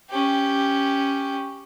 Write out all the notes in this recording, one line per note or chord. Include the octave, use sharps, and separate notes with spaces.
C#4 G4